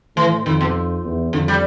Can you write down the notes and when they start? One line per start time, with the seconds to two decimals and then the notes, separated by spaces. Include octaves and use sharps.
0.16 A2 E3
0.45 F2 D#3
0.61 B2
1.04 E2
1.33 F2 D3
1.48 G3